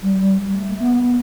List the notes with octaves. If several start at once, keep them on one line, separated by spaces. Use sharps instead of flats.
G3
A3
B3
B3